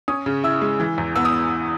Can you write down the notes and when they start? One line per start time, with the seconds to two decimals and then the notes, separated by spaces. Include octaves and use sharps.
0.08 C#4 D#6
0.26 C#3
0.44 E4 E6
0.62 G#3
0.80 E3
0.98 E2
1.16 B3 E6
1.25 D#6